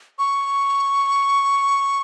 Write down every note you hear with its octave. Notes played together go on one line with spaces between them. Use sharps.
C#6